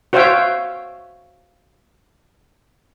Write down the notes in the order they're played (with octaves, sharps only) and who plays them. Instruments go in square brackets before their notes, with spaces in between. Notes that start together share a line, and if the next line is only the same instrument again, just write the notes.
[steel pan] F#4 C5 C#5 E5 F5 G5